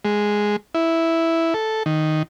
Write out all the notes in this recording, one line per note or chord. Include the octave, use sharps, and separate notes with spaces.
G#3
E4
A4
D#3